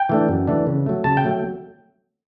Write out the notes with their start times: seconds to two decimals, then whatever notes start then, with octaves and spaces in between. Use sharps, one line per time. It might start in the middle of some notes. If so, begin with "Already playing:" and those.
Already playing: G5
0.09 E3 A3 D4
0.28 F#2
0.47 E3 A3 D4
0.67 C#3
0.86 F#3 A3
1.04 C#3 A5
1.17 G5
1.24 F#3 A3